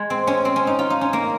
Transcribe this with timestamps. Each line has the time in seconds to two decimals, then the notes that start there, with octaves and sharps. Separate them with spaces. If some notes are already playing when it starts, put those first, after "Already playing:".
Already playing: G#3
0.10 C4
0.27 C#4
0.45 C4
0.56 C#4
0.67 D#4
0.79 F4
0.90 D#4
1.01 C#4
1.13 A#3